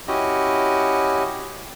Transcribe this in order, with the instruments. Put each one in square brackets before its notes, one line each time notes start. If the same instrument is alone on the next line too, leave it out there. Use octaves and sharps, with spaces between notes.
[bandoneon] C#4 E4 F#4 G4 D#5